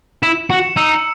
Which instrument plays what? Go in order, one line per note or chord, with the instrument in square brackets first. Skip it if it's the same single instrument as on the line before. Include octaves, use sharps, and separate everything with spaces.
[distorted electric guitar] E4 [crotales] E7
[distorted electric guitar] F#4 [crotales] C#7
[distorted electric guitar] D#4 [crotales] E6